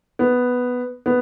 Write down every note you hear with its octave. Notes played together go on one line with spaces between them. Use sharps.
B3
B3